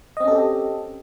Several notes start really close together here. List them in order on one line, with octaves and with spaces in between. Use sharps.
D#5 C4 C#4 A4 G4